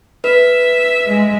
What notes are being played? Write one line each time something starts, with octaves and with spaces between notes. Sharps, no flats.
B4 E5
G#3